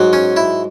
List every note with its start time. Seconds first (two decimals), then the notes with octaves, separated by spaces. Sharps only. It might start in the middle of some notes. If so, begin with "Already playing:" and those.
Already playing: G#2 F#3
0.13 C#4
0.37 E4